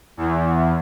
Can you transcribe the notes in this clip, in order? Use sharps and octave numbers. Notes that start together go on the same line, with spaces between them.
E2